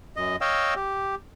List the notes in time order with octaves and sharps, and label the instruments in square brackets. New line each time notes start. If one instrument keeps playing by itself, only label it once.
[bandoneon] F#2 D#5
C#5 D#5 F5 G5 E6
G4